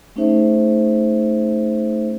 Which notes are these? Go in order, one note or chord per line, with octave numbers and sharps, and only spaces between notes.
A3 C#4 D#4 G#4 C5 E5